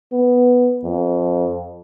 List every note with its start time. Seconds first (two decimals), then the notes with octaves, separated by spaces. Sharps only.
0.12 B3
0.84 F2